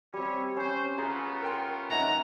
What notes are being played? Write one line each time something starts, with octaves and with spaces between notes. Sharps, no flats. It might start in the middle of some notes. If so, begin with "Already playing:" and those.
G3 C4 C#4 C#5 E5
C#4 C5
A3 B3 F4 G#4 A#5
A#4 G5 C6
C#4 D#4 E5 F#5 A#5